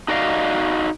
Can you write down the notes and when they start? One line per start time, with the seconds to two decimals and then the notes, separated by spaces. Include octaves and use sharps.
0.08 D#4 F#4 D5 D#5 F5